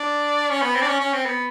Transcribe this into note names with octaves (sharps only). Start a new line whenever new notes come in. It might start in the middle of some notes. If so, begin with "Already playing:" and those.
Already playing: D4
C#4
B3
C4
D4
C#4
C#4
C4
B3